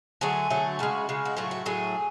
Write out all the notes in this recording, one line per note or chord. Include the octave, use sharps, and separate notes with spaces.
D3 F#3 A3 G#4
D3 F#3 A3
C#3 G#3 F#4
C#3 G#3
F#4
A2 F#3 A3 F4
F#4
A2 F#3 A3 G#4